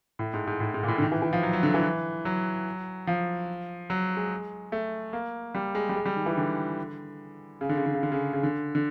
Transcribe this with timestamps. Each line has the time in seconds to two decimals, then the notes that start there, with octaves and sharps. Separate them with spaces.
0.19 A2
0.33 G#2
0.47 G#2
0.60 A2
0.74 G#2
0.83 A#2
0.88 A2
0.98 D3
1.02 D#3
1.12 E3
1.22 E3
1.33 F3
1.43 F#3
1.53 F#3
1.63 D3
1.74 E3
2.25 F#3
3.07 F3
3.90 F#3
4.17 G#3
4.72 A3
5.13 A#3
5.55 G3
5.75 G#3
5.89 G3
5.96 G#3
6.06 G3
6.16 D#3
6.26 E3
6.37 D3
7.61 C#3
7.69 D3
7.77 C#3
7.86 D3
7.94 C#3
8.03 D3
8.12 C#3
8.33 C#3
8.43 D3
8.75 D3